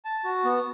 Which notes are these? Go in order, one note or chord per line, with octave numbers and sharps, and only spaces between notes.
A5
F#4
B3